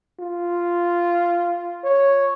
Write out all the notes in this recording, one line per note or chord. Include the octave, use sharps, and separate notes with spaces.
F4
C#5